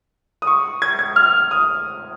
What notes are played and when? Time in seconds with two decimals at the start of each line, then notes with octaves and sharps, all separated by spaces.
0.42 D#6
0.47 C#6
0.82 G#6
0.99 G#6
1.16 F6
1.51 D#6